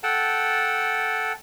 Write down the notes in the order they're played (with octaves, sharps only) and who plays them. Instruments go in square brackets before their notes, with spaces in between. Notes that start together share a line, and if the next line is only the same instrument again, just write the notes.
[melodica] A4 F#5 G5 A5